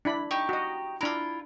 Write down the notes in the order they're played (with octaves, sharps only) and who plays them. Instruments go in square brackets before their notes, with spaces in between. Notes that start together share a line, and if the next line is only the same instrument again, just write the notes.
[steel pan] D4 E4 B5
[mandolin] D#4 G4 C#6
[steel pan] F#4 D#5
[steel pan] D4 A#5 [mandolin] E4 F4